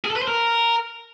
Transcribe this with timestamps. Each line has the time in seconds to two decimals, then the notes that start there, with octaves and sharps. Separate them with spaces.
0.05 G#4
0.10 A4
0.16 B4
0.22 C5
0.28 A#4